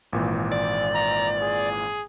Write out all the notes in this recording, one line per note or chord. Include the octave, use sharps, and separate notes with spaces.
G#1 A#2 E3
D5
A#5
G#4